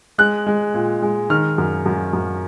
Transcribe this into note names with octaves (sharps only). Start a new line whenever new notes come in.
G#3 F#6
G#3
A#2
G#3
D#3 F6
F#2
F#2
F#2